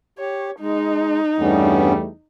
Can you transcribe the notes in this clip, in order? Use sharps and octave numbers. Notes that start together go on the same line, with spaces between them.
G4 C#5
G#3 D#4
E2 G2 G3 A3 B3 C#4